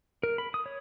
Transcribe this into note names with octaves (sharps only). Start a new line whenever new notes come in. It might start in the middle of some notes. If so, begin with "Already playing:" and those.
A#4
B5
D#6
C#5